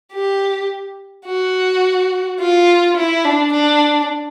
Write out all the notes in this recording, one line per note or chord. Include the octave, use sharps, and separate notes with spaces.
G4
F#4
F4
E4
D4
D4